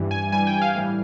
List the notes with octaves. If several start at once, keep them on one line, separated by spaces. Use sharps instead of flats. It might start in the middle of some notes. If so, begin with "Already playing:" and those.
Already playing: G2 E3 G3
G#5
G2 E3 G3 G#5
G5
F5
A2 E3 G3